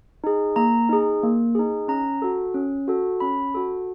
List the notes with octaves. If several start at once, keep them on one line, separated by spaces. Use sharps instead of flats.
D#4 G#4
A#3 A#5
D#4 G#4
A#3
D#4 G#4
C#4 A#5
F#4 A4
C#4
F#4 A4
C#4 B5
F#4 A4